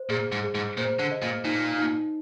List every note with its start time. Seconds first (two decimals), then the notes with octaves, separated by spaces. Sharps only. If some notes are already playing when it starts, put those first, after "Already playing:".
Already playing: C5
0.10 A#2 G#4
0.32 G#2
0.43 G#4
0.55 G#2
0.77 A#2 C5
0.99 D3
1.12 D#5
1.22 A#2
1.45 A#2 D#4
1.78 D#4